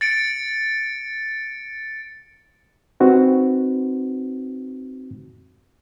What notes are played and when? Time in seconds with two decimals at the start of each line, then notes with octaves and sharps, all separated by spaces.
0.01 A6 C#7 D7
3.00 C4 D#4 F#4 B4